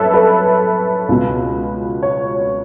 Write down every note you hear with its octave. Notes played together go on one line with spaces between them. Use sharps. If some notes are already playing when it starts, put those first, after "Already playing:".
Already playing: F#2 A4 B4 C#5 E5
B4
C#2 B2
C#5